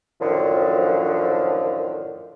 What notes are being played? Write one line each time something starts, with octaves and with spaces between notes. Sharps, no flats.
F#2 A2 D3 D#3 F3